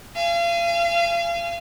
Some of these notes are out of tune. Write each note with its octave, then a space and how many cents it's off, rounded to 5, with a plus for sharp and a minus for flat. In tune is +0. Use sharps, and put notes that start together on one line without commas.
F5 -35 G#5 +0